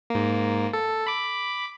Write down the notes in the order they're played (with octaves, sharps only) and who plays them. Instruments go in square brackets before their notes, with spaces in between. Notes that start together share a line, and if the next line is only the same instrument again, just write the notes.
[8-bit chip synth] G#2 A#3
A4
B5 D6